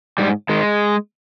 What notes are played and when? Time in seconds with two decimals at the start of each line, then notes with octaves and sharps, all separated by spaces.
0.18 G#2 G3
0.49 D#3 G#3